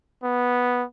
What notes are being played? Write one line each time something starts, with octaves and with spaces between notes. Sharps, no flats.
B3